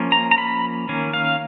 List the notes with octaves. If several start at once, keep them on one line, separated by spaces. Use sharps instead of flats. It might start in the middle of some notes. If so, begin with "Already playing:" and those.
Already playing: F3 A#3 C#4
A#5
A#5
B5
D#3 A#3 C#4
F5